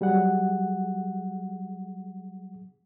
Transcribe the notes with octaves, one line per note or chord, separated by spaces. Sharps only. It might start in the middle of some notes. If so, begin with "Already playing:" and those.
F#3 G3 G#4 F#5